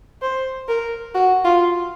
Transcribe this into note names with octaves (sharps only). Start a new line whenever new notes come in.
C5
A#4
F#4
F4